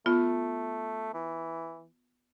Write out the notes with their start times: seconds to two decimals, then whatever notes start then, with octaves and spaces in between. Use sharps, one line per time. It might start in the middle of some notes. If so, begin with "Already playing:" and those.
0.06 A3 B3 F4
1.14 E3